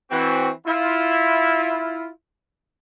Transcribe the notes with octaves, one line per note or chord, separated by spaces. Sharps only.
E3 C4 F#4
E4 F4